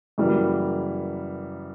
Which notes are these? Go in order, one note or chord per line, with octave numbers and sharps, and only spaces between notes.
F#2 C#3 E3 G3 A#3